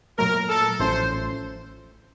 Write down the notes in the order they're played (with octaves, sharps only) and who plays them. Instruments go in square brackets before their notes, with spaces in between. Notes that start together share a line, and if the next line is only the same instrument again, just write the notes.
[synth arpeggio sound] A#2 F#3 A3 [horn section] A#4
[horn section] A4
[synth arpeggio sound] A1 A2 F3 A3 C#4 [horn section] C5